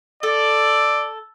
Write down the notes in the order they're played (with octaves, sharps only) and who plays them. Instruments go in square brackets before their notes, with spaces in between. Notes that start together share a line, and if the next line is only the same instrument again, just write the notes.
[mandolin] A4 [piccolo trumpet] D5